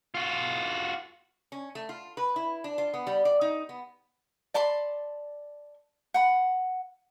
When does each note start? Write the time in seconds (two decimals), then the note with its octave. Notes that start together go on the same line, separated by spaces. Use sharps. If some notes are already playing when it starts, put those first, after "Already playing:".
0.14 F4 F#4
1.52 C#4
1.75 A3
1.89 F4
2.17 B4
2.36 E4
2.64 D4
2.78 F4
2.94 B3
3.07 G3
3.25 D5
3.41 D#4
3.69 B3
4.54 D5 A5 B5 C6
6.14 F#5 B5